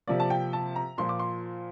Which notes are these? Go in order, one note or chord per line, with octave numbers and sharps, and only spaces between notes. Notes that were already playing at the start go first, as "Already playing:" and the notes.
C3 F3 A#3 D5
A5
G5
A5
A#5
A#2 F3 A#3 C6
D6
C6